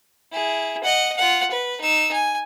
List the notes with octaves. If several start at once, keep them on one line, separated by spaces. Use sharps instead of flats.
E4 G#4
D#5 F#5
F4 F#5
B4
D#4 E6
G#5